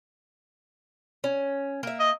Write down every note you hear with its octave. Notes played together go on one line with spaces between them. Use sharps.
C#4
A#3 E5
D#5